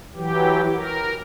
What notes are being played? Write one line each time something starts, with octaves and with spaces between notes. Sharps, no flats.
E3 F#3 G4
A#4